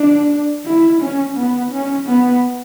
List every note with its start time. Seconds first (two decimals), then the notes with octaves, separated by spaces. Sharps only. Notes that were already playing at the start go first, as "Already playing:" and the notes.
Already playing: D4
0.65 E4
1.01 C#4
1.36 B3
1.71 C#4
2.06 B3